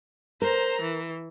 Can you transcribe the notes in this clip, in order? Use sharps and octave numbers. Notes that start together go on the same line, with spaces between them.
A#4 C5 A#5
E3